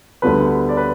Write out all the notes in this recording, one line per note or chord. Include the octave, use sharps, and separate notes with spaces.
D2 D3 G3 B3 B4
D5
B4